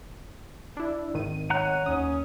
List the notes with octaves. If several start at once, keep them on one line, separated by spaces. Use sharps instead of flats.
D4 E4
G#1 D#3 D#7
C#5 F#5 A#5 F#6
D#2 C#4 D#6